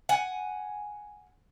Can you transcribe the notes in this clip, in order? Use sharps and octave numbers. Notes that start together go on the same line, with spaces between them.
F#5 G#5